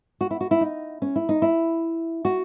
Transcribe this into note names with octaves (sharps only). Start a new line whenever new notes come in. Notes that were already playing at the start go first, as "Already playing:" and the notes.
F#4
E4
F#4
E4
D#4
C#4
E4
D#4
E4
F#4